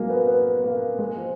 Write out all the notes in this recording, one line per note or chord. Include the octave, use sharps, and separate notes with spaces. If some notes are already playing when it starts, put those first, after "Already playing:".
Already playing: F#3 G#3 A#3
B3
B3
A#3
G#3
F3